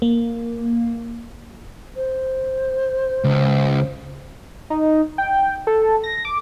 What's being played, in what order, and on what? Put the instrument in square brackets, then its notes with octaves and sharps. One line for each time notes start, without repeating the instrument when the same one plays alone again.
[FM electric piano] A#3
[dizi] C5
[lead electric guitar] C#2
[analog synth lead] D#4
G5
A4
A#6
D6